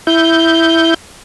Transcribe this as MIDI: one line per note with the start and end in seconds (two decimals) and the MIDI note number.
0.07 0.94 64
0.07 0.94 91